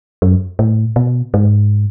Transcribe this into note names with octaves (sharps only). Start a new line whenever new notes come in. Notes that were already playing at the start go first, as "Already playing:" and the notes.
F#2
A2
B2
G#2